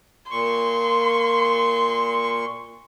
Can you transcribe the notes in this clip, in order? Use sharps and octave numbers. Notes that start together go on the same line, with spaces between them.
A#2 C6 C#6